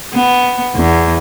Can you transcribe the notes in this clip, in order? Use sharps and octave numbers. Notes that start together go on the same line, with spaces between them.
B3
E2